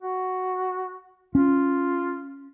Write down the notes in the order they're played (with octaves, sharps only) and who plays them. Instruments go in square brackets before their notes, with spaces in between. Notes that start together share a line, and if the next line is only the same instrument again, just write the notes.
[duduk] F#4
[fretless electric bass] C#4 [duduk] F4